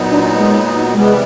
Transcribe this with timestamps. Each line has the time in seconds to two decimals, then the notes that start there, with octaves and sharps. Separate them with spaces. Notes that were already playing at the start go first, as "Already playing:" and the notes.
Already playing: A#2 F#3 B3 D#4
0.10 D4
0.38 G#3
0.95 C3 E3 G3 G#3 B3